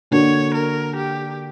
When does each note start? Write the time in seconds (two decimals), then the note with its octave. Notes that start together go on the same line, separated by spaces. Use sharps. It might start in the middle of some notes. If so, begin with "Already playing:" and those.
0.11 D3 A#3 D4 F#4 C#5
0.54 A#4
0.96 G4